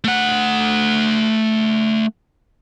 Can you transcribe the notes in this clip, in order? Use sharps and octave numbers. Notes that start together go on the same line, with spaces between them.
A3 F#5